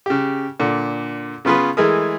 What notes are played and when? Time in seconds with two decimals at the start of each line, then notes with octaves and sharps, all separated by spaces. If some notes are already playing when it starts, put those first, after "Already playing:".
0.06 C#3 G4
0.60 A#2 D3
1.45 C#3 B3 F4 G#4 B4
1.77 E3 G#3 A3 G#4 A#4 D#6